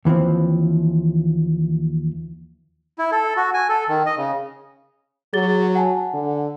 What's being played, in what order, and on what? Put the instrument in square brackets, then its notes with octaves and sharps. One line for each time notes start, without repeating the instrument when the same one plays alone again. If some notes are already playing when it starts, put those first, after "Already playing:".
[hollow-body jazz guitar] D#2 E3 F3 C4
[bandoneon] E4
A4
F#4
G#5
A4
D#3
D#5
C#3
[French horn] F#3 [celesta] G#4 A6 G7
[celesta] F#5 G#5 A5
[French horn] D3